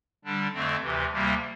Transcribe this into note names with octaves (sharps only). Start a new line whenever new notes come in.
D3 G3 D4
F2 D3 A3 C4
D2 C3 E3
D2 C3 G3 A#3